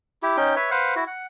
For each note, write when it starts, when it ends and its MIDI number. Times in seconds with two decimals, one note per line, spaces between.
0.23 0.37 64
0.23 0.37 67
0.37 0.55 61
0.37 0.55 63
0.37 0.55 79
0.56 0.70 71
0.56 0.70 73
0.56 0.70 76
0.71 0.95 71
0.71 0.95 72
0.71 0.95 77
0.71 0.95 78
0.96 1.04 64
0.96 1.04 66
1.07 1.26 78